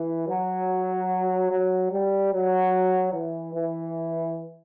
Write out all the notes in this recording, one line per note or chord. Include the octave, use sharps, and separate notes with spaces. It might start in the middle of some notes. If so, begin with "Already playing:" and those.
Already playing: E3
F#3
F#3
G3
F#3
E3
E3